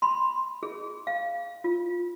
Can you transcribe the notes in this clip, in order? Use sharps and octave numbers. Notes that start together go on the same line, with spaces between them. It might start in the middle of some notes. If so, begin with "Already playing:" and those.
B5 C6
G#4
F5
F4